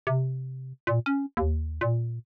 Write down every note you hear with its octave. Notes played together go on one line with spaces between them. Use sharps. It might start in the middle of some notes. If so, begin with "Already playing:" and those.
C3
A#2
C#4
D#2
A#2